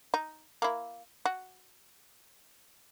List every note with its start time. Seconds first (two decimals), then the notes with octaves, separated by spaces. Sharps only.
0.14 D#4
0.62 A#3 E4
1.26 F#4